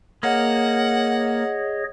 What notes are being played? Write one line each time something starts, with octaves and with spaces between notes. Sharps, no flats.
A#3 G#4 C#5 D#5 F#5